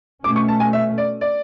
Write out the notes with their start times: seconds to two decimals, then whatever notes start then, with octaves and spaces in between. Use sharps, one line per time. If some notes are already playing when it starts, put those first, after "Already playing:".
0.24 B2 A3 C#4 D6
0.36 C#6
0.48 A5
0.60 G#5
0.73 E5
0.98 D5
1.21 D5